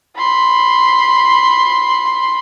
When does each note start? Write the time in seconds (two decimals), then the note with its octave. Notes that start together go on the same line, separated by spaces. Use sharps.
0.17 B5 C6